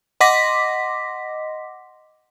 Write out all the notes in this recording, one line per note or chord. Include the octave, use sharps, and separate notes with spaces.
D#5 F#5 C6 D6 A#6 B6